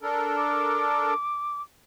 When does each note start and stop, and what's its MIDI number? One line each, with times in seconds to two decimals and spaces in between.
0.02 1.14 62
0.02 1.14 69
0.02 1.14 70
0.37 1.61 86